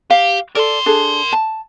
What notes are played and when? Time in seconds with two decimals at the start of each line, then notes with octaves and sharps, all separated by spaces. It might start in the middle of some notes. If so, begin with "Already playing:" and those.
0.10 G4 F5
0.55 A4 A#4 D5 C6
0.86 D4 G#4 A4
1.32 A5